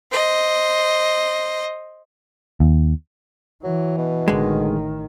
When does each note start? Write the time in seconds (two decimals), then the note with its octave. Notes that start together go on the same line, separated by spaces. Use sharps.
0.11 C5 D#5
2.60 D#2
3.64 E3 F#3
3.98 B2
4.28 A1 D3 D#3 G#3